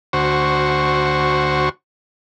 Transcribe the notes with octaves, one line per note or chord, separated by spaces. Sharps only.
D2 F#4 C5 C#6